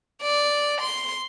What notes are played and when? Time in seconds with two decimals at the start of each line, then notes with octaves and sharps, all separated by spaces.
0.22 D5
0.81 C6